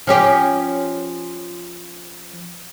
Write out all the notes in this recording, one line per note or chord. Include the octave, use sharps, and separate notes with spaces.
F3 C#4 G4